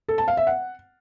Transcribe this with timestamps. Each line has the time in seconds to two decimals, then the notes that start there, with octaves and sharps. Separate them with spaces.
0.08 A4
0.18 A5
0.28 F5
0.37 E5
0.47 F#5